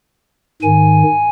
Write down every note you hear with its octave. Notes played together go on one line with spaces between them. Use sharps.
G#2 D#3 G#5